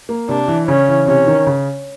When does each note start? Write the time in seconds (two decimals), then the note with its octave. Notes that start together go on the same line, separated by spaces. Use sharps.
0.09 A#3
0.29 C3 D4
0.48 E3
0.67 C#3 C#4
0.88 E3
1.07 C3 C#4
1.27 D#3
1.47 C#3